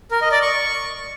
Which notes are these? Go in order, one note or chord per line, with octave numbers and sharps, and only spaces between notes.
A#4
D#5
D5
C#6